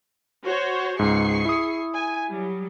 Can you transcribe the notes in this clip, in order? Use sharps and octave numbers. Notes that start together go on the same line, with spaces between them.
F#4 C5 C#5
C#2 G#2 G#4 C#6 C7
E4 D#6
G#5
F#3 G3